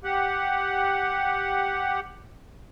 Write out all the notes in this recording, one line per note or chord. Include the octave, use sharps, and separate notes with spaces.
G4 F#5